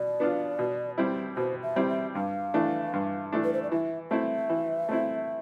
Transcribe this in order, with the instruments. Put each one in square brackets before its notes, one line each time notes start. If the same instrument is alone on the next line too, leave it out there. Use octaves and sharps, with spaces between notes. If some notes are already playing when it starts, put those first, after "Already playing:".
Already playing: [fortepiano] B2 [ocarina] D5
[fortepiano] B3 D4 F4
B2
G3 C4 E4
[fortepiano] B2 [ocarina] C5
[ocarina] E5
[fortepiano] G3 C4 E4
[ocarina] E5
[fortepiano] G2 [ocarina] F5
[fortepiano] E3 A3 D4
G2
E3 A3 D4
[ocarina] B4
C5
D5
[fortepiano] E3 [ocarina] E5
[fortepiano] A3 C4 E4 [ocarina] E5
[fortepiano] E3
A3 C4 E4